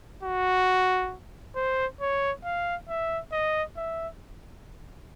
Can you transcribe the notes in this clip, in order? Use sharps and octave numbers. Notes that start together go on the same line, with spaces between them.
F#4
C5
C#5
F5
E5
D#5
E5